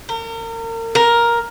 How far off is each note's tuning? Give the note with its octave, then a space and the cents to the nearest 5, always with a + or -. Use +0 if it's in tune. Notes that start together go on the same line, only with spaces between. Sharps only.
A#4 -35
A#4 +10